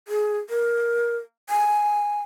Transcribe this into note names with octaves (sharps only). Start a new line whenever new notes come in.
G#4
A#4
G#5